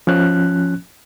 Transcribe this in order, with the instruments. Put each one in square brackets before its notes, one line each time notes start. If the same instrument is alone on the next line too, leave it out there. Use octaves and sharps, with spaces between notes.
[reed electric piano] F3 C#4 F#6